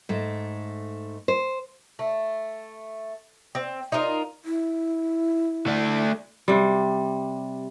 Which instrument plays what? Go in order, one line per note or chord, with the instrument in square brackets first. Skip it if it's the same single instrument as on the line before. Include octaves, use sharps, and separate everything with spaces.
[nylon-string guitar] G#2 A3
C5
[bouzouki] A3
C4
D#4 F4 A#4 D#5
[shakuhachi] E4
[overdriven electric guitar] A3 D4
[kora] C3 G3